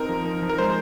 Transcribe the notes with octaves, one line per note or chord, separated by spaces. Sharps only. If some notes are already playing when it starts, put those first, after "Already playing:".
Already playing: C4 D#4 A#4
F3
D#4
F3
A#4
G#3 C5